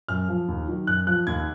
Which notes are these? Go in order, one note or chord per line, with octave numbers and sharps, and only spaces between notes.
F#2 F6
F3
D#2
D#3 F#3
F#2 F#6
F3 F#6
D#2 G#6